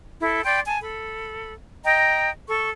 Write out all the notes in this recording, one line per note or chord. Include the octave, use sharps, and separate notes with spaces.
E4 A4
D5 G5 B5 C6
G#5 A5
A4 B5
D#5 G5 A#5
A4 C#6